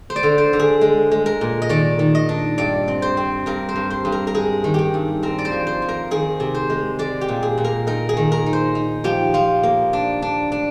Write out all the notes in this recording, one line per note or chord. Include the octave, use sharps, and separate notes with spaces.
C5
D5
D3
C5
D3
G#4
G#3
G#3
A#4
A#2
D#5
D#3 D5
D#3
D#5
D4
G2 D5
C4
C5
C4
G2 A#4
C5
G2
C5
G2
A#4
A#4
G#3 G#4
D#3
G4 G#4
G2
C4 A#4
D5
C5
F3
C5
F3
A#4
D#3 G#4
C3
C5
G#3
G#3 D5
G4
A#2
G#4
A#2
A#4
D#4 A#4
G#4
D#3
A#4
D#4
C5
D#4
F3 G4
F3 F4
A#3
D4
D4
D4